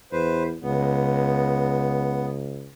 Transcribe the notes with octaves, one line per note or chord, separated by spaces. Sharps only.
E2 B4 C5
C#2 B3